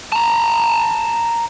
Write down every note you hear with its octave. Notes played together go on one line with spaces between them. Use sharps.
A5 A#5